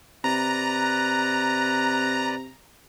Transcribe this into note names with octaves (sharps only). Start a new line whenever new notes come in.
C3 B4 D5 A#5 F#6